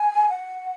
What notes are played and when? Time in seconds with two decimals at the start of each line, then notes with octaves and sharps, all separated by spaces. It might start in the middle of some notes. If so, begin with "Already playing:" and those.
Already playing: G#5
0.29 F#5